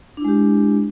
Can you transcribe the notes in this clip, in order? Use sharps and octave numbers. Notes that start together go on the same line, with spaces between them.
G#3 D4 E4 G4